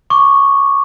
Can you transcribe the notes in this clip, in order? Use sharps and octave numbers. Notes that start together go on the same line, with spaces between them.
C#6 D6